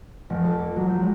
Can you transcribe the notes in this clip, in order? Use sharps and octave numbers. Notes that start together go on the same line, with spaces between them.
F1
A4
A#3
F#3
G6
G#3